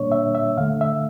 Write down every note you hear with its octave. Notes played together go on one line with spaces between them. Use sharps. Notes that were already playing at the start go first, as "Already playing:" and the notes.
Already playing: A#2 G3 A#3 D4 C#5
E5
E5
D3 A3 F5
E5